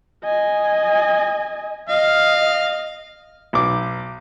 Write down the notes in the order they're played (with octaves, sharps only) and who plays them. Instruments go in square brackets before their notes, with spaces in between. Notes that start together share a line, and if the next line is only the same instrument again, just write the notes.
[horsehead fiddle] D#5 G#5
[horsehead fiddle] D#5 [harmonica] F5
[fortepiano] B1 D6